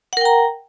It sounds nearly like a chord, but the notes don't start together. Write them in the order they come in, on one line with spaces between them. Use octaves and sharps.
F#5 A#4 G5 A#5